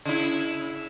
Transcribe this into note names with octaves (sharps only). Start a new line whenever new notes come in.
C#3 E4